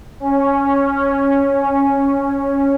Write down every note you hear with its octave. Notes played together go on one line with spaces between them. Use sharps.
C#4